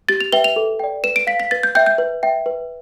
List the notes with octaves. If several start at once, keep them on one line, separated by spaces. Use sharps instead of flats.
G4 A6
F7
B4 E5 G5 G7
F7
A4
D5 G5
B4 E7
D7
F5 B6
B6
B4 A6
G6
E5 G5 G6
G6
B4
E5 G5
B4